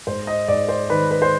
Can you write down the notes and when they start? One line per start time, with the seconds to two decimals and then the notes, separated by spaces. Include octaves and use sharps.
0.07 G#2 C5
0.27 D#5
0.48 G#2 D5
0.69 C5
0.89 D#3 B4
1.11 B4
1.22 C5